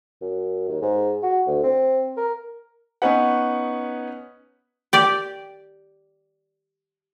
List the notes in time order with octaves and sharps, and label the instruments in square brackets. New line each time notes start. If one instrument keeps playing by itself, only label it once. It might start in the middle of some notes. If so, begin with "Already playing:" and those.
[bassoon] F#2
D#2
G#2
F#4
D2
C4
A#4
[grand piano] B3 C#4 D#4 B4 F#5
[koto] G4 D5